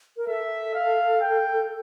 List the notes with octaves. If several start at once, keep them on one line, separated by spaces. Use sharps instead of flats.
A#4
A4 E5
F5
G5